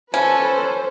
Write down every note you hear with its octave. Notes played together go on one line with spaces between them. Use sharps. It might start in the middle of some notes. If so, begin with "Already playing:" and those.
C#4 A4 B4 C5